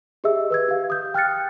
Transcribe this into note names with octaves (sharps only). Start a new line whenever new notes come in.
G4 G#4 D#5 E5 E6
B4 E6 G#6
G4 F5
D#6 G6
G5 F6 F#6 A6 C#7